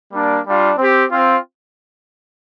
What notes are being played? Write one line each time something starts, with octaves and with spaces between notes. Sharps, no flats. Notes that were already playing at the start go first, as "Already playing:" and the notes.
G3 A#3 D4
G3 D4 F4
C4 G4
C4 F4